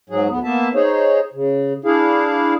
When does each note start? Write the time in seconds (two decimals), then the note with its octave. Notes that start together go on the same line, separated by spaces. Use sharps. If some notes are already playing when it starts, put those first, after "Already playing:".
0.09 G#2 F#3 G#4
0.30 D2 B3
0.44 A#3 B3 E5 A5
0.75 D#4 G#4 C5 C#5
1.34 C#3
1.85 D4 E4 G#4 F5